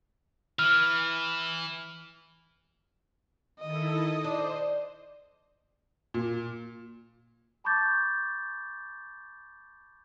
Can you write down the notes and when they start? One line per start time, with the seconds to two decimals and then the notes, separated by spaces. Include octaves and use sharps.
0.59 E3 F6
3.60 D#3 E4 A4 D#5
4.24 D4 C5
6.14 A#2
7.64 A5 B5 C#6 D6 G6 A6